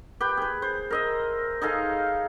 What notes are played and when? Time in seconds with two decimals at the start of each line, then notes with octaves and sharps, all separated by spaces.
0.21 G4 B4 G5
0.37 G#4 B4
0.62 C5
0.91 A#4 D#5 E5
1.62 D#4 G#4 A4 F5